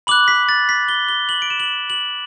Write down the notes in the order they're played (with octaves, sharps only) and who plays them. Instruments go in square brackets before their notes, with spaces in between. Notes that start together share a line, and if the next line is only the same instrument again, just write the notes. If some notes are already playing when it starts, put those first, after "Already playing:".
[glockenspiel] B5 D6 F#6 F#7
B6
A6
B6
G7
G7
F#7
D7
E7
F#7
F#7